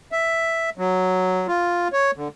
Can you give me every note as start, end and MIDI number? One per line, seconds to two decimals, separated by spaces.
0.12 0.70 76
0.78 1.47 54
1.48 1.88 65
1.93 2.11 73
2.17 2.28 50